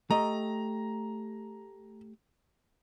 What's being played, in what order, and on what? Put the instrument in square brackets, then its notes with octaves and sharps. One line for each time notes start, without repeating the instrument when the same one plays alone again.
[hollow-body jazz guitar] A3 G4 D#5 [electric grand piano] A#5